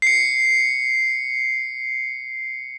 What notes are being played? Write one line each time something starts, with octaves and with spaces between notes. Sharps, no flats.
C7 C#7